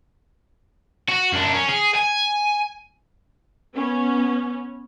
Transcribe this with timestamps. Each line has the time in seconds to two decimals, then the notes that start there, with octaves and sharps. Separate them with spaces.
1.08 F#4
1.33 F#2 D4
1.54 C#4
1.69 G#4
1.95 G#5
3.75 B3 C#4